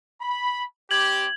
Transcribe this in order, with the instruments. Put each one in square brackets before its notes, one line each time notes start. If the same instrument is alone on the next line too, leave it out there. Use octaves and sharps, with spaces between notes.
[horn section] B5
[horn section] G3 C4 G4 [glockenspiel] G#6 F#7